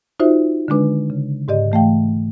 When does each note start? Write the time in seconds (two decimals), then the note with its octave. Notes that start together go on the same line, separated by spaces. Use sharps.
0.20 D#4 F4 F#4 C5 D5 E5
0.68 D3 D#3 G#3 D4 B4
1.10 C#3
1.48 G#2 G4 D5 D#5
1.72 E3 A3 F5 G5